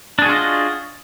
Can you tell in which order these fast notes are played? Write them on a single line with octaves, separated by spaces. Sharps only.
D4 G#4 F#4 F4 D#5